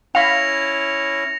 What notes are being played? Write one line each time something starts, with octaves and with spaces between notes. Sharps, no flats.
C#4 E4 F5 B5 A#6 C#7 F7